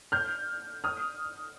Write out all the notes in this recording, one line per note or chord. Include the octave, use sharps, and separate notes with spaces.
F6 G6
D#6 F6